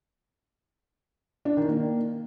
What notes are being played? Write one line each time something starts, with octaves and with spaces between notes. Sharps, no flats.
D4
D#3
A#3